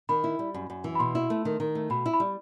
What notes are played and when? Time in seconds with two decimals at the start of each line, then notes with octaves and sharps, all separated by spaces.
0.09 D#3 B5
0.24 E4
0.39 G3
0.54 F#2
0.70 F#2
0.84 E3
0.95 B5
0.99 B2 C6
1.15 E4
1.30 A3
1.45 D#3
1.60 D#3
1.75 A3
1.90 B2 B5
2.06 E4
2.14 B5
2.20 G3